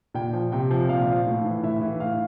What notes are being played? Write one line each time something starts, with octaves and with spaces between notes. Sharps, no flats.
A#2 G5
F3
C3 G5
F3
A#2 F5
F3
A2
E3
A2 E5
E3
A2 F5